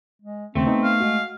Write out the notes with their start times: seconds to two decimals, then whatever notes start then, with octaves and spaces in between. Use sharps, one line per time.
0.22 G#3
0.55 D#2 C#3 A3 C4
0.67 B3 D#4
0.84 F5
1.00 G#3 F#4